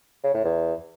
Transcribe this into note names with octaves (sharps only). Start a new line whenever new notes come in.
C#3
A2
E2